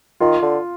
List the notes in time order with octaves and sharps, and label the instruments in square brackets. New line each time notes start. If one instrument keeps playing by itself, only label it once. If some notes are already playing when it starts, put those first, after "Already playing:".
[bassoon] D#3 [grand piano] F4
[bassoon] D3